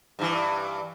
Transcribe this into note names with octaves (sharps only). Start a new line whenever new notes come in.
G2 E3